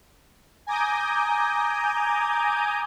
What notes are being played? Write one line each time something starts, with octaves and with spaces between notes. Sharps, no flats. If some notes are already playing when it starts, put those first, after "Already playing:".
G#5 A#5 D6 D#6 G6